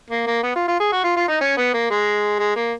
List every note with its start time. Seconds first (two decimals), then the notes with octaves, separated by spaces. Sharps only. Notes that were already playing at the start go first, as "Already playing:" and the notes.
0.10 A#3
0.27 A#3
0.43 B3
0.56 F4
0.68 F4
0.80 G#4
0.92 F#4
1.04 F4
1.17 F4
1.28 D#4
1.41 C#4
1.58 B3
1.74 A#3
1.90 G#3
2.39 G#3
2.56 A#3